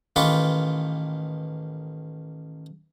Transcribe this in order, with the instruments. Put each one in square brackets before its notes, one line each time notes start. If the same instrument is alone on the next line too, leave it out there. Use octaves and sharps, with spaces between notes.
[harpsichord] A1 D#3 F4 B4 C#6 D6